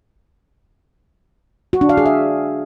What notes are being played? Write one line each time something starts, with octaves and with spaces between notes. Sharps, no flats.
F#4
D4
F5
G#4
E5